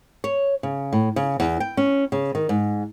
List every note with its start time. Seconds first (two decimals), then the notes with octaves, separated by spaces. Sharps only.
0.24 C#5
0.63 C#3
0.93 A2
1.16 C#3
1.40 E2
1.60 G5
1.77 C#4
2.12 C#3
2.35 D#3
2.49 G#2